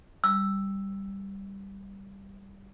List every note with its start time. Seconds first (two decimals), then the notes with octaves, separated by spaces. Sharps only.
0.24 G3 E6